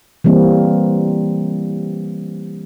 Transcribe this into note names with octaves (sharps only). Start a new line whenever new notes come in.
E3 G3 A#3 C4